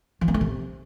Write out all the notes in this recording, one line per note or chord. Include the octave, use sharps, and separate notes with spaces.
F3
A#3
A3
C3